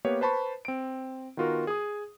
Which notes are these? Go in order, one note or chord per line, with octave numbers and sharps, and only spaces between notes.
A#3 B3 G4 B4 C#5
B4 C5 A5 B5 C#6
C4 D7
D#3 B3 F4 F#4 A#4
G#4 D#6